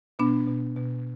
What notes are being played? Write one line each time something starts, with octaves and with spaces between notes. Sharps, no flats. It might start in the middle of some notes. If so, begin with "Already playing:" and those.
B2 B3 D4
B2
B2